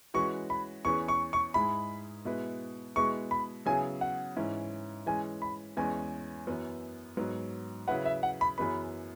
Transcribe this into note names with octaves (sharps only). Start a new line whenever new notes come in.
E3 G#3 C#4 F#4 B4 C#6
B5
E2 E3 C#4 G#4 B4 C#6
C#6
C#6
G#2 G#3 E4 G#4 B5
B2 G#3 E4 B4
B2 G#3 E4 G#4 B4 C#6
B5
C#3 F#3 B3 E4 G#4 G#5
F#5
G#2 E3 C#4 E4
E3 G#3 C#4 G#5
B5
E2 E3 G#3 C#4 G#5
F#2 E3 B3
G#2 F#3 B3
C#3 F#3 E4 B4 F#5
E5
F#5
B5
F#2 E3 B3 G#4 B4 B5